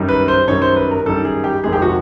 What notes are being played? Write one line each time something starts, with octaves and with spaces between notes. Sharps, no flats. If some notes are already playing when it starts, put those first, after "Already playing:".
Already playing: F#2 D#3 G3
B4
C5
F#2 D#3 G3 C#5
C5
B4
A#4
F#2 D#3 G3 A4
G#4
G4
F2 C3 D#3 G#3 G#4
G4
F#4